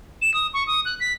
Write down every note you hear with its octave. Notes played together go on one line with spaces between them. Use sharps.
E7
D#6
C#6
D#6
F#6
B6